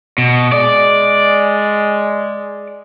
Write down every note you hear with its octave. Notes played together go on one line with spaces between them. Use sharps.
B2
G#3 D5